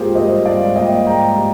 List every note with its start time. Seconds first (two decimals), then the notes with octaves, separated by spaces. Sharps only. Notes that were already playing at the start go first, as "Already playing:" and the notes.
Already playing: G#2 A#3 F4 G4 G#4 A#4 C5
0.15 G3 C5 D#5
0.45 G#2 D5 F5
0.76 A#3 D#5 G5
1.07 G#2 G5 A#5
1.37 G3